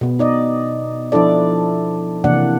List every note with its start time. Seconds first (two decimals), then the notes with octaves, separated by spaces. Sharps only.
0.01 B2 B3
0.19 D#4 D5 D#5
1.12 F3 D4 E4 A4 D5
2.24 C3 E3 A#3 D4 D5 F#5